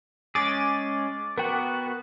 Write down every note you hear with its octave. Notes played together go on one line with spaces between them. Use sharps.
G#3 C#4 G#4 D6 A6
B3 F#4 A#4 G5